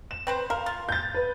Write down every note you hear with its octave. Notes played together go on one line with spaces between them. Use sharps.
E7
C4 B4 C5
A#4 F5
F4
G6 A6
B4